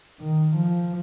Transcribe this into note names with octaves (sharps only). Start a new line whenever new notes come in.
D#3
F3